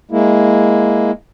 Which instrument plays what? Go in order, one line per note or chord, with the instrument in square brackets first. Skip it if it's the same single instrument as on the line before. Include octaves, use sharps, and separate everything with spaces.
[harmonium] G#3 A#3 E4